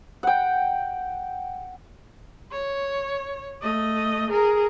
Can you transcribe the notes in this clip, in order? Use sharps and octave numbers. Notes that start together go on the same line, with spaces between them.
F#5 G5
C#5
A3 D#5
G#4 A#4